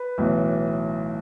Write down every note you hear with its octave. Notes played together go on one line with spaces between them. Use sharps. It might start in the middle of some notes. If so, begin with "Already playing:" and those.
Already playing: B4
B1 A2 E3